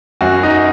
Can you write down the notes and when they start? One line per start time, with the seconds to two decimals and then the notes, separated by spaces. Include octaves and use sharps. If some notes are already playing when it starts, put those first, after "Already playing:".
0.21 F#2 F#4
0.43 D#4